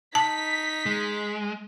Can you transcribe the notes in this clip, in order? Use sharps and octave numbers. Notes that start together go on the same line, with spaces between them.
D#4 A5 B6
G#3